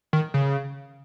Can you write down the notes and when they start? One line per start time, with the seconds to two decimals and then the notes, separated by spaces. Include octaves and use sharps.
0.13 D#3
0.34 C#3